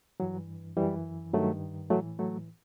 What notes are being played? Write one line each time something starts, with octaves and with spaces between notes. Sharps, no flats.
G2 E3 F#3
F#2 E3 G3
G2 D#3 F#3 A3
A2 E3 F#3 A3
F#3 A3